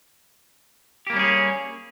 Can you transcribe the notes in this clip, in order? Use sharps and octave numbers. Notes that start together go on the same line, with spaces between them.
G3 A#3 C#4 G4 G#4